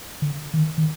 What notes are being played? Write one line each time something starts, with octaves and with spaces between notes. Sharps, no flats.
D3
D#3
D#3